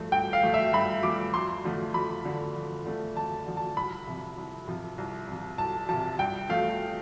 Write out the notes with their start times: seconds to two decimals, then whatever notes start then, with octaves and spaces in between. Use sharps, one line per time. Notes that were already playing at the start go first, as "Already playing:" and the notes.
Already playing: G2 F3 A3
0.12 G2 G5
0.33 F5
0.43 F3 A3
0.54 E5
0.73 G2 B5
1.03 F3 A3 D6
1.34 F2 C6
1.64 D3 F3 A3
1.94 F2 B5
2.25 D3 F3 A3
2.56 F2
2.85 D3 F3 A3
3.15 F2 A5
3.46 D3 F3 A3
3.57 A5
3.76 C2 B5
4.07 C3 F3
4.38 C2
4.68 C3 F3
4.98 C2
5.28 C3 F3
5.58 C2 A5
5.89 C3 F3 A5
6.19 G2 G5
6.49 F3 A3 F5